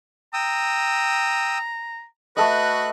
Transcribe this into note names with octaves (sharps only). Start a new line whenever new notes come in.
G5 A#5 D#6 E6
A3 F#4 A4 B4 D#5 F#6